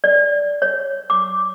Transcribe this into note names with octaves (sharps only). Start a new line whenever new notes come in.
D5
C#5
D6